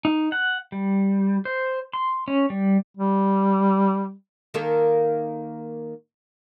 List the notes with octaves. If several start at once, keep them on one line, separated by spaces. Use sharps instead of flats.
D#4
F#5
G3
C5
C6
C#4
G3
G3
D#3 A#3 A4